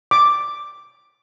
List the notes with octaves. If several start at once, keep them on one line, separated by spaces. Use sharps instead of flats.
D6